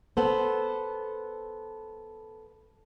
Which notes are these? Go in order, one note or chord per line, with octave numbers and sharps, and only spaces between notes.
B3 A4 C5